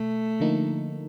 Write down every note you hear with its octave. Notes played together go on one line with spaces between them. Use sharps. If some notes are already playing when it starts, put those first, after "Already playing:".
Already playing: B2 A3
D3 F3 A#3 D#4